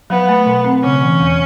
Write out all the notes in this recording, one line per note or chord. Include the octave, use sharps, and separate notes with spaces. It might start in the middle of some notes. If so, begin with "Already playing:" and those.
F#3 B3
A3
B2
C4
C#3 C#4
E3
E2